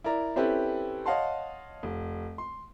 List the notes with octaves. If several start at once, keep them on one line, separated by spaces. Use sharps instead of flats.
E4 A#4 D5 A#5
C4 C#4 E4 G4 A4 B4
C#5 D#5 F5 F#5 A5 C6
F1
C6